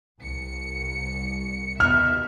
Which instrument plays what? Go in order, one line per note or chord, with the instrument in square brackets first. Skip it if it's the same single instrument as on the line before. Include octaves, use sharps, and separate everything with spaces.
[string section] C2 C#7
[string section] D#2 B2 E5 [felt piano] F6